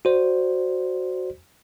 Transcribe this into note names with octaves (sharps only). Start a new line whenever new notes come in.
F#4 C5 D5